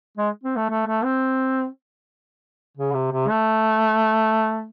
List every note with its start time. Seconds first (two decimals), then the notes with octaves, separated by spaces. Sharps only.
0.17 G#3
0.44 C4
0.56 A3
0.70 A3
0.87 A3
1.04 C4
2.77 C#3
2.94 C3
3.12 C3
3.29 A3